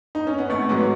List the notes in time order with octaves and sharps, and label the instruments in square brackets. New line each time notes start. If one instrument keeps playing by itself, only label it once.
[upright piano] D#4
C#4
B3
G#1 A3
G#2 F#3 G#3 B3